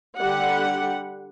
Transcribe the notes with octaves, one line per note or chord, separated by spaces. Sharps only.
D3 G3 G4 F#5